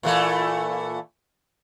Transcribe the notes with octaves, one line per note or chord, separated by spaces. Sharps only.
A#2 E3 A3